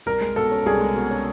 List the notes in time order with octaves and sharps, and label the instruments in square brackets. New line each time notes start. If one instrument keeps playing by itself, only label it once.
[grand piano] C2 [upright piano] A#4
[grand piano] G#3
[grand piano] B2 [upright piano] A4
[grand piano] C#4
[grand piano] C2 [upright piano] G#4
[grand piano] G#3
B2
C#4